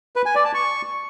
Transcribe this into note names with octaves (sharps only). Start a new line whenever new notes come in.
B4
G#5
D5
A5
C#6